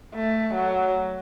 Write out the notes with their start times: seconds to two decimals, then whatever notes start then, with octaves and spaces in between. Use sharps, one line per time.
0.15 A3
0.55 F#3